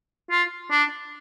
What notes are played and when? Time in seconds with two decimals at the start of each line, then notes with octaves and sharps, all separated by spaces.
0.30 F4
0.71 D4